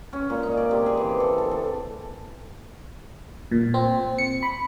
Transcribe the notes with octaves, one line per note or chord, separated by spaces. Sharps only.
C#4
A#2
D#4
D5
C3
G#4
E3
A4
A4
A4
A#2
C4
C#7
B5